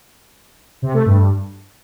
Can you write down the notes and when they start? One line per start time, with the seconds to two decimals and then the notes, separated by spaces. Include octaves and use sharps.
0.82 C3
0.94 A3
1.05 G2